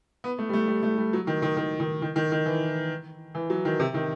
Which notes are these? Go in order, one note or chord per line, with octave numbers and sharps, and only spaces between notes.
B3
A3
G3
A3
G3
A3
G3
F#3
D#3
D#3
D#3
D#3
D#3
D#3
D#3
E3
E3
F#3
D#3
C3
D#3